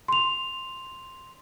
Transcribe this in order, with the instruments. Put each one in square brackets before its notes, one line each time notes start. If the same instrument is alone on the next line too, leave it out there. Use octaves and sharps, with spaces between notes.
[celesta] C6 F7